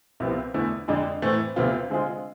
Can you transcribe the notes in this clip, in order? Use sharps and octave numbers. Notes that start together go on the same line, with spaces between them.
C2 C3 F3 B3 F4
E2 D3 A3 E4
F2 D3 G#3 D4
A2 E3 A3 C4
D2 C3 F3 B3 F4
D3 G#3 C4 F4 G#4